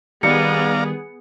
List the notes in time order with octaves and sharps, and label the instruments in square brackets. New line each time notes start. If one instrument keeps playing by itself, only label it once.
[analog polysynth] D#3 G3 [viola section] B3 G#4 [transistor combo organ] D5 F5 A#5 [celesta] C#7